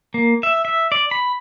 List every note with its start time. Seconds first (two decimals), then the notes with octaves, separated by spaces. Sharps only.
0.14 A#3
0.43 E5
0.65 E5
0.92 D5
1.11 B5